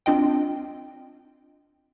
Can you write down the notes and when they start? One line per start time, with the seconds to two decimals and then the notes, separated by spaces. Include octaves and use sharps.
0.06 C4 D4 F4 D#5 G5